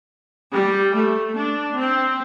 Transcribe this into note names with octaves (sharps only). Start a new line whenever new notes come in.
G3
A3
D4
C4